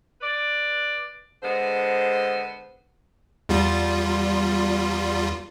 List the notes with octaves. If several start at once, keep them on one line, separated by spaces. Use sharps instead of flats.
B4 D5
D3 G#3 B3 C5
E2 G3 F4